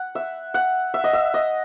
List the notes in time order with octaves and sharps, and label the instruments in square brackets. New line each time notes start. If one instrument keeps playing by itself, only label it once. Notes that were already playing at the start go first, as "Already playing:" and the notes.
Already playing: [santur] F#5
E5
F#5
E5
D#5
E5
D#5